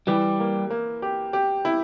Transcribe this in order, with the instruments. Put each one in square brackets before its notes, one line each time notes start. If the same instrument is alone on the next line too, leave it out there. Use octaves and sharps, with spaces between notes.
[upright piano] E3 [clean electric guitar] G3 G4
[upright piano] A#3
A#3
G4
G4
E4